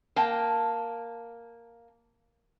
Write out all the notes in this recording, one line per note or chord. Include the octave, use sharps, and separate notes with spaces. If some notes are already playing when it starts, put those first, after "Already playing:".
A#3 G5 A5